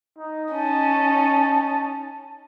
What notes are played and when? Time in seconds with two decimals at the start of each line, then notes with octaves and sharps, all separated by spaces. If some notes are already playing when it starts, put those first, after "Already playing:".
0.18 D#4
0.52 C#4 D#4 A5